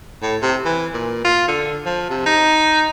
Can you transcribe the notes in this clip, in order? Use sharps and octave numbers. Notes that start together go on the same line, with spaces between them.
A2
C3
E3
A#2
F4
D3
F3
C3
D#4